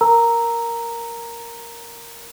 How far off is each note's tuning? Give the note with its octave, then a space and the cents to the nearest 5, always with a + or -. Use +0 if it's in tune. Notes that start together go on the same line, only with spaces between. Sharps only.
A#4 +0 A#5 -5 E6 -5